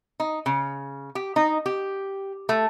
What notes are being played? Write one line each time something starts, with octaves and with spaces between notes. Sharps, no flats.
D#4
C#3
G4
D#4
G4
A3